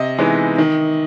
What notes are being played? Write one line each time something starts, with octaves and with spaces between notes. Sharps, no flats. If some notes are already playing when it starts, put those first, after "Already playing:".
Already playing: C3 D#5
E3 G#3 B3 D#4
D#3